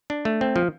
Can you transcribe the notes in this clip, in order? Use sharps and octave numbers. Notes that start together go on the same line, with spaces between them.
D4
A3
C4
F3